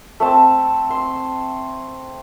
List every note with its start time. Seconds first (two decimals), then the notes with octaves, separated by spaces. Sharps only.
0.20 A3 C4 A5
0.90 C6